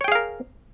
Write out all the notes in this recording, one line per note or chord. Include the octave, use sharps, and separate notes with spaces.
G#4 A#4 C#5 F5 G5